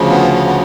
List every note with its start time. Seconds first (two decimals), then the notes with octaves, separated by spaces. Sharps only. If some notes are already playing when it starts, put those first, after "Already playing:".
Already playing: D2 C#3 F3
0.10 B3
0.34 B3
0.47 B3